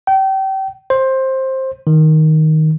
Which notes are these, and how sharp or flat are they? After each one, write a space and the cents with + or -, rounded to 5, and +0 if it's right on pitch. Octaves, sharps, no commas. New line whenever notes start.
G5 -30
C5 +15
D#3 +5